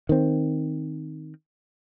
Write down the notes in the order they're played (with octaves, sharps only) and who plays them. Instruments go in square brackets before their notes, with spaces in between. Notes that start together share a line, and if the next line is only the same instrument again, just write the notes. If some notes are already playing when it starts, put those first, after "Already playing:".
[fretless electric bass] D#3 C4